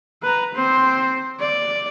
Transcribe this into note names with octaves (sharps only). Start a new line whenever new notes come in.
B4 A#5
C4 C5
D5